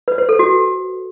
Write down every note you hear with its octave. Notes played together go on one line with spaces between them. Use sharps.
B4
C5
A4
F#4